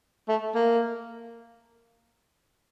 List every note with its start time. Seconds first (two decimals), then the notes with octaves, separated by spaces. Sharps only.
0.28 A3
0.55 A#3